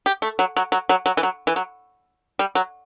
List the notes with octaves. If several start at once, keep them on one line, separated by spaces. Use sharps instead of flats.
G4
A3
F#3
F#3
F#3
F#3
F#3
E3
F#3
E3
F#3
G3
F#3